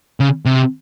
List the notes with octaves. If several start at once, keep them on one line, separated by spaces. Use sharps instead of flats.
C#3
C3